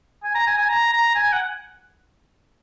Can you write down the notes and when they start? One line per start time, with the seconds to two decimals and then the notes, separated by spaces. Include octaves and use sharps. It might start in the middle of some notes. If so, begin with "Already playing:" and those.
0.23 G#5
0.35 A#5
0.47 G#5
0.58 G#5
0.69 A#5
0.92 A#5
1.15 G#5
1.32 F#5